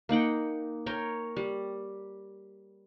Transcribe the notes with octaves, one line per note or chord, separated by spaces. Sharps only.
A#3 D#4 F#5 G5
A#4 C#5 G5
G3